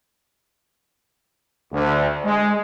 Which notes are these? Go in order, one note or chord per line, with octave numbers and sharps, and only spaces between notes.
D2
G#3